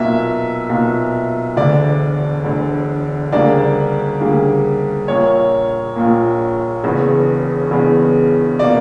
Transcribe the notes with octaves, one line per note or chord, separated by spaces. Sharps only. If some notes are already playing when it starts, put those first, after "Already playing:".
Already playing: B1 A#2 A#3 E5
B1 A#2 A#3
E1 D2 D3 D5
E1 D2 D3
D2 C#3 G3 A#3 D4 D5
D2 C#3 G3 A#3 D4
A#1 A#2 A#3 C#5
A#1 A#2 A#3
E1 E2 C#3
E1 E2 C#3
B2 A#3 D5